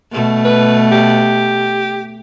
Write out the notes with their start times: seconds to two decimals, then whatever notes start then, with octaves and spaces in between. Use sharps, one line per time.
0.12 B2 A3
0.45 B4
0.92 G4